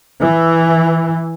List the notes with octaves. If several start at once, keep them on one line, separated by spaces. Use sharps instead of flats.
E3